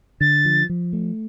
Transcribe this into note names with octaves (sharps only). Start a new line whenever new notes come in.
D3 A6
F3
F3
A3